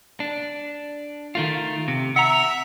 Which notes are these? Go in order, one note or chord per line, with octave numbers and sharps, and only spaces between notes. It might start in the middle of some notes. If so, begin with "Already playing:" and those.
D4
D#3 A3 F4
C3
E5 F#5 A#5